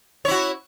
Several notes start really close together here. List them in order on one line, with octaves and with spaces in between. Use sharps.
C#5 E4 F#4